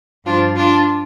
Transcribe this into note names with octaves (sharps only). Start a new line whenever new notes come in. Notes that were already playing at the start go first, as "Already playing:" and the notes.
G2 F3 D4 F4
D4 F4